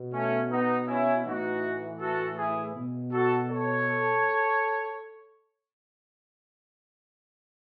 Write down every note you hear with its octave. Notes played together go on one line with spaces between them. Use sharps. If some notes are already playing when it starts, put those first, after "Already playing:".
Already playing: B2
A3 C#4
B3 D#4
C#4 E4
A2 E3 D#4 F#4
F#4 A4
E4 G#4
B2
F#4 A4
A4 C#5